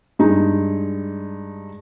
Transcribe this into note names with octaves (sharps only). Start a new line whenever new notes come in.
G2 G#3 D#4